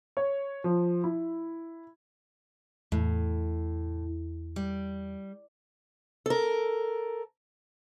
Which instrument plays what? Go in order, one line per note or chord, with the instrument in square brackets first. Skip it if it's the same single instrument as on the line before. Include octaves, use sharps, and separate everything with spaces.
[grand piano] C#5
F3
E4
[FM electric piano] E2 [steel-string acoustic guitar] A2
[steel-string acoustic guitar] G3
A4 A#4